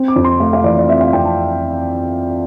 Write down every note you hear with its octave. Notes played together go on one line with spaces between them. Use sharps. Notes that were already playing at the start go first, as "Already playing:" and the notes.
Already playing: C4
D6
F2
C6
A3 F5
F5
E3 D5
D5
C4 E5
F5
F2 G5
A5